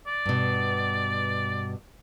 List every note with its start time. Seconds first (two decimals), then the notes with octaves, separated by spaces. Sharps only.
0.07 D5
0.26 G2 B2